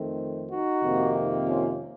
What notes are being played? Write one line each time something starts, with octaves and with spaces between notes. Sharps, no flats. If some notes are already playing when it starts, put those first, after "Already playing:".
Already playing: F2 D#3 A3 C4
D#4 F#4
F2 C3 D#3 A#3
C#4 F4